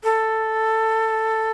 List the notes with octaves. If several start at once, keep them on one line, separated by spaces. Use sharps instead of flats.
A4